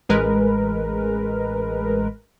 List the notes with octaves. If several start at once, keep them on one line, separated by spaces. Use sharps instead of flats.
A1 G#3 A#4 B4